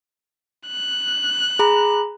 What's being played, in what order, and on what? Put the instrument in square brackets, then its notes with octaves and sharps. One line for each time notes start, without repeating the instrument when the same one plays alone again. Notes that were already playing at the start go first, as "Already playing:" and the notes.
[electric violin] F#6
[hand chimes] G#4 A#5 B5